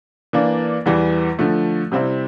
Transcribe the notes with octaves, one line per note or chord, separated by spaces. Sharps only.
E3 A#3 D4
E2 E3 G3
D3 F3 A3
C3 G3 C4 E4